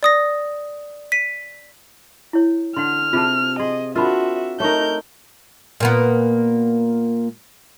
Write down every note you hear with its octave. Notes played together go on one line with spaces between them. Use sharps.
D5 D#6 A#6
B6 D#7
E4 C#5
D3 F#5 C6 F6
C3 F4 G#4 F5 A5
G#4 D#5 C6
C4 D4 F4 F#4 A#4 E5 B5
A3 D#4 A#4 C#5 C#6 G6
A#2 A#3 B3